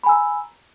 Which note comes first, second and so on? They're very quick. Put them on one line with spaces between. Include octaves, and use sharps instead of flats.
B5 G#5 E6 A#5